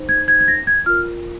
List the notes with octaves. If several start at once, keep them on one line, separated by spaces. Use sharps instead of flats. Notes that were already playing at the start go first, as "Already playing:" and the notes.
Already playing: D#4 C5
G#6
G#6
G#6
A#6
G#6
F4 A#4 F6